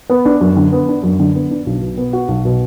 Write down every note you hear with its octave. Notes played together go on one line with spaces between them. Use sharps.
B3
D4
F#2
D3
B3
D4
F#2
D3
B3
D4
B1
B2
B3
F#4
B1
B2